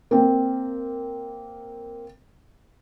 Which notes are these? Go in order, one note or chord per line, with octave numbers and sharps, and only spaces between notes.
A#3 C4